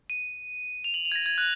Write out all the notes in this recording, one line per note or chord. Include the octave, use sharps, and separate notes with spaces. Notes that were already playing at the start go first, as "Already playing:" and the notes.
D#7
F7
F#7
F7
G#6
A#6
G#6
F#6